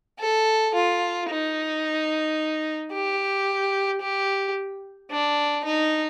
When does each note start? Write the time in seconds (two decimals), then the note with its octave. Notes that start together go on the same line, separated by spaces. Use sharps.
0.20 A4
0.74 F4
1.29 D#4
2.92 G4
4.01 G4
5.10 D4
5.64 D#4